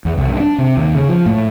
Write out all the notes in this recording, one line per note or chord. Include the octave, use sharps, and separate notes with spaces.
E2
C2
G2
D4
C3
D#2
C#3
F3
A2